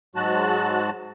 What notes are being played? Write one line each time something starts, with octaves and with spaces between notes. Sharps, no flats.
G#2 F#3 G#3 F#4 A5 F#6